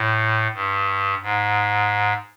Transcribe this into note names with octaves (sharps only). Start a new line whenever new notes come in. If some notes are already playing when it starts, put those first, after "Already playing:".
Already playing: A2
G2
G#2